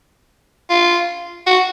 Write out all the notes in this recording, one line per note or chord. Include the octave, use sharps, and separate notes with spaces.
F4
F#4